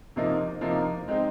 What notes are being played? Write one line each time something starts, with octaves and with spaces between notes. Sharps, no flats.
C3 F3 A#3 D#4
C3 F3 A#3 D#4
G#3 C4 D#4